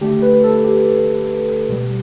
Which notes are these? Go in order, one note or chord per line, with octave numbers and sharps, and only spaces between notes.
D3 A3 G4
B4
A4
G4
B2 G3